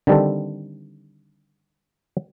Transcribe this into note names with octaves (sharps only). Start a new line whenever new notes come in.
D3 D#3 G3 C4 A4